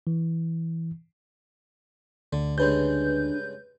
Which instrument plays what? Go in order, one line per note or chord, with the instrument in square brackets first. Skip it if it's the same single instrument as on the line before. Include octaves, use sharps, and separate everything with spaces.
[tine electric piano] E3
[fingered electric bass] D2 [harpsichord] D3
[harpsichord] G2 C#3 G#3 [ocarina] D4 [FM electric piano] B4 G6